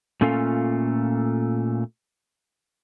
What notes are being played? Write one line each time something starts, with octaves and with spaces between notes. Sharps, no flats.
A#2 A3 C#4 F4 A4 F5